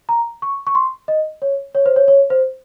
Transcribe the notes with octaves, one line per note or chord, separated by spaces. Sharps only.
A#5
C#6
C#6
C6
D#5
C#5
C#5
C5
C#5
C#5
C5